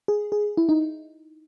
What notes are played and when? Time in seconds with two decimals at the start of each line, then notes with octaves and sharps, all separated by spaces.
0.08 G#4
0.32 G#4
0.57 E4
0.69 D#4